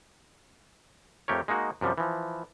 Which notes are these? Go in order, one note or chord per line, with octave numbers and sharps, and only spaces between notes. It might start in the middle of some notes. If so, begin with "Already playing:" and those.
F2 A3 G4 A#4 C#5
G#3 A#3 D#4 F#4
F#2 C3 F3 G3
E3 F3